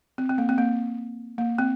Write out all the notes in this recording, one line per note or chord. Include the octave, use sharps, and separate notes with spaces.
C4
C4
A#3
C4
A#3
A#3
C4